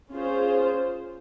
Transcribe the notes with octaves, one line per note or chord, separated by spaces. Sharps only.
C#4 F4 G#4 C5